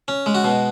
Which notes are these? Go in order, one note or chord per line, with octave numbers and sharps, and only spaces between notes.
C#4
G#3
F#4
B2